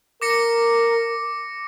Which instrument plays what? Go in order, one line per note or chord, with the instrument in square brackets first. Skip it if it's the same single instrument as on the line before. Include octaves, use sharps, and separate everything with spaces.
[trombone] A#4 [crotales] D6 A#6 C#7